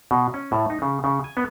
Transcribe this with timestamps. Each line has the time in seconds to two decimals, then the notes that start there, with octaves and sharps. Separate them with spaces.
0.11 B2
0.34 C#4
0.52 A2
0.70 D#4
0.82 C#3
1.04 C#3
1.24 G#5
1.37 B3